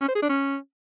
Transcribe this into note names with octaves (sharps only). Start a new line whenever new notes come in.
C#4
C5
G#4
D4
C#4